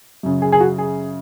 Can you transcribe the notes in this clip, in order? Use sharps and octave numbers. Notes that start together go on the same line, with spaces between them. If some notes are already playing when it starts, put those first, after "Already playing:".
F#2 C#3
G#4
G#4
F#4
G#4